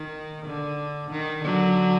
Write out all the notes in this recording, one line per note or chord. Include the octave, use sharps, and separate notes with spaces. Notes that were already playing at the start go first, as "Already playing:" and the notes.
Already playing: D#3
D3
D#3
D3 F#3